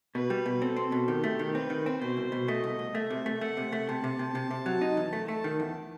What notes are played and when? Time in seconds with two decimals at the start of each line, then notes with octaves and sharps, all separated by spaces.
0.15 B2 B4
0.30 G3
0.46 B2
0.62 C4 A4
0.76 C4
0.92 B2
1.08 D#3 G4
1.24 A3
1.39 D#3
1.55 C4 B4
1.70 D#3
1.86 C4
2.01 B2 C5
2.17 C2
2.32 B2
2.48 A3 D#5
2.64 C2
2.79 C2
2.95 A3 E5
3.10 C3
3.26 A3
3.41 A3 F#5
3.57 C3
3.72 A3
3.88 C3 A5
4.04 C3
4.19 C3
4.35 C3
4.51 C3
4.66 F#3
4.81 D#4
4.97 E2
5.13 A3
5.28 A3 A5
5.44 D#3
5.60 E2